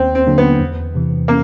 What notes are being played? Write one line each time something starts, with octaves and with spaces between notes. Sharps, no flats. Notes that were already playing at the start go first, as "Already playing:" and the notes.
Already playing: D#2 C4
C4
D3 F#3 A#3 D4
B3
E2
C3 E3
A#3